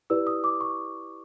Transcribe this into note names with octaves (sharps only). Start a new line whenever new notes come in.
E4 G4 B4 D5 E6
D#6
D6
C#6